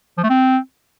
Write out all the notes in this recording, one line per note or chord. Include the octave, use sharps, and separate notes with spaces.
F3
A3
C4